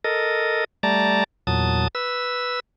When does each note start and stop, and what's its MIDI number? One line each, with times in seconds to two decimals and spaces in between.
0.04 0.64 69
0.04 0.64 70
0.04 0.64 75
0.83 1.24 55
0.83 1.24 57
0.83 1.24 74
0.83 1.24 81
0.83 1.24 82
1.47 1.88 40
1.47 1.88 46
1.47 1.88 54
1.47 1.88 81
1.47 1.88 87
1.95 2.60 71
1.95 2.60 88